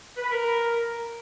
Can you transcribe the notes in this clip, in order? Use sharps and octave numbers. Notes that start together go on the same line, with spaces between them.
B4
B5
A#4